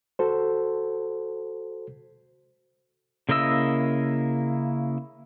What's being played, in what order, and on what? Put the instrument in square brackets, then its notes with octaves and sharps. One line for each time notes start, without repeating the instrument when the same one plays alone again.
[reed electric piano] F#4 A4 C5
[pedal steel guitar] C#3 A#3 E4 D#5 E6